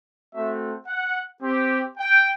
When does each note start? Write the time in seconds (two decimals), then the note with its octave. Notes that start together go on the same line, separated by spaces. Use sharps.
0.33 A3 C4 F#4 E5
0.88 F#5
1.42 C4 G4
1.98 G5